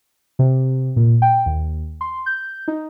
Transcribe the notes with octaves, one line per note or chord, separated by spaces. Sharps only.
C3
A#2
G5
D#2
C6
G6
D#4